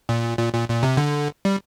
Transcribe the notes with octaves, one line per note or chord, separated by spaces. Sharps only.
A#2
A#2
A#2
A#2
C3
D3
G3